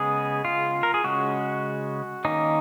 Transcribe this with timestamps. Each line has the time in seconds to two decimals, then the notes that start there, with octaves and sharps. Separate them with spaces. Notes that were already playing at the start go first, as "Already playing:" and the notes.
Already playing: C#3 G#3 B3 G#4
0.45 F4
0.83 A#4
0.94 G#4
1.04 C#3 G#3 C#4 F#4
2.25 D#3 A#3 C#4 D#4